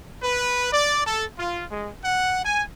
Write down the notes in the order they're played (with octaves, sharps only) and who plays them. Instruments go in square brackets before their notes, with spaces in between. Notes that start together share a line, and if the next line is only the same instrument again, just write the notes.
[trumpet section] B4
D5
A4
F4
G#3
F#5
G#5